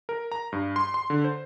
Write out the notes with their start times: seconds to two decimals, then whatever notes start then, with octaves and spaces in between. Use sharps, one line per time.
0.09 A#4
0.32 A#5
0.52 G2
0.76 C6
0.94 C6
1.10 D3
1.24 C5